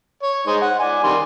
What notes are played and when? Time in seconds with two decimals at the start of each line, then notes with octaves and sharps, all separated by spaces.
0.23 C#5
0.47 G#3 D#4 C5
0.62 F#5
0.79 D5 G#5
1.03 D#3 G3 C6